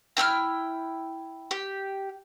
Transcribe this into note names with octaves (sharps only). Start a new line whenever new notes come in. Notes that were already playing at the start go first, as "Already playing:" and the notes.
E4 G5 E6 F6
G4